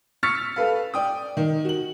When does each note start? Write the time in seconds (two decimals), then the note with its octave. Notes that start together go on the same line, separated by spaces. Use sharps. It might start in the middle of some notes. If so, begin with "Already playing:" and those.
0.23 C#6 E6 F6 A6 B6 C#7
0.56 A4 B4 F5
0.94 D5 G5 D#6
1.37 D#3
1.65 F#4 F#7